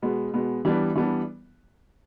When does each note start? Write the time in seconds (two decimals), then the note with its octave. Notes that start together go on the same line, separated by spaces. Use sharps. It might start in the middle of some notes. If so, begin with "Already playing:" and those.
0.02 B2 G#3 B3
0.34 B2 G#3 B3
0.65 E3 G3 B3 D4
0.95 E3 G3 B3 D4